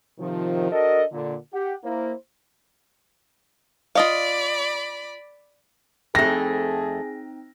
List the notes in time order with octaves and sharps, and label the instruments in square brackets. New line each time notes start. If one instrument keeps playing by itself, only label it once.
[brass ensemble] C3 D#3 F3
D4 F#4 A4 A#4 D#5
A#2 D3
G4 F#5
A#3 E4 C5
[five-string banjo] F4 D#5 F5 [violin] D5 B5
[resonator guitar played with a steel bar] F2 A3 [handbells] C4 D#4 G5 [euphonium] G#4 [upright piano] A#6